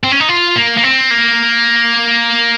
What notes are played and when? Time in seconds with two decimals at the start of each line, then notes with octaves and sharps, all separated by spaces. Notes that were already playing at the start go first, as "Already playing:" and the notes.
0.04 C4
0.12 C#4
0.20 D#4
0.29 F4
0.56 A#3
0.77 A#3
0.83 C4
1.11 A#3